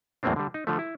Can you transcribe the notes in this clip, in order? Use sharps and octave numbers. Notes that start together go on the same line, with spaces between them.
E2 A2 F#3 A#3 C4 D4
D3 G3
D#4
D3 F3 A3
E4